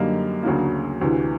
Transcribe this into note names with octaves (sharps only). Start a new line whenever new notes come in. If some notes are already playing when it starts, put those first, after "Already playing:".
Already playing: F#2 D3 G3 A#3 D#4
D2 C#3 F#3 A#3
D2 C3 E3